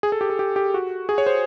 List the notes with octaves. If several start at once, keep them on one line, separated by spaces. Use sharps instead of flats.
G#4
A4
G4
A4
G4
G4
F#4
G#4
C#5
C5